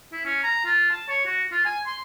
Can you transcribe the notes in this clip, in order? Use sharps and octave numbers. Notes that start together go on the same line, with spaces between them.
E4
C#4
A#5
F4
A5
C#5
F#4
F4
G#5
C6